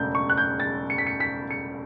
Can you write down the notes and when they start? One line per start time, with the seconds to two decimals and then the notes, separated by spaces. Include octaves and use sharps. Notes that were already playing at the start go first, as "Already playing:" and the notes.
Already playing: E1 D2 C#3 G6
0.15 C#6
0.30 F#6
0.37 G6
0.60 A6
0.90 C#7
0.98 B6
1.07 C#7
1.20 B6
1.51 C#7